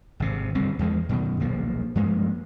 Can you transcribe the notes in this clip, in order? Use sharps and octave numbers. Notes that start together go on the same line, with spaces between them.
G#1 C3
G1 C2 D3 C4
E2 F3 G#3
F#2 B2 D#3
D#1 B1 F3 A#3
G2 F3 G#3 A#3